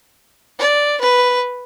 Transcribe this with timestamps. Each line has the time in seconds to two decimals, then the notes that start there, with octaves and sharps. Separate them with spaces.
0.59 D5
1.01 B4